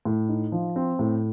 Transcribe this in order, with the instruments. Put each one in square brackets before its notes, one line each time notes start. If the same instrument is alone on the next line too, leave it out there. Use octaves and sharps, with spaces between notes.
[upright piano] A2
D#4
F3
C4
A2